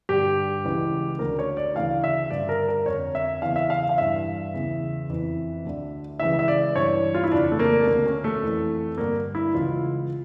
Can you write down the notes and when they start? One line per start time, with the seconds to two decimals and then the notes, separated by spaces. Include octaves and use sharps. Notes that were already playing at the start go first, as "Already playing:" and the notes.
0.09 G2 D3 G4
0.64 C#2 C#3 E3
1.19 D2 D3 A#4
1.39 C#5
1.57 D5
1.75 D2 C#3 E3 F5
2.04 E5
2.30 G2 D3 D5
2.49 A#4
2.68 A#4
2.86 F2 D3 C#5
3.15 E5
3.41 E2 C#3 E3 F5
3.56 E5
3.70 F5
3.89 F5
3.98 G2 E3 E5
4.54 E2 C#3 E3
5.09 F2 E3
5.65 D2 D3
6.20 C#2 C#3 E3 E5
6.39 E5
6.48 D5
6.76 G2 E3 C#5
7.15 F4
7.24 E4
7.32 F2 C#3 E3 D4
7.52 A3
7.59 A#3
7.80 A3
7.87 D2 D3 A#3
8.06 C#4
8.24 A3
8.42 F2 E3
8.98 G2 D3 A#3
9.35 E4
9.53 C#2 C#3 E3 F4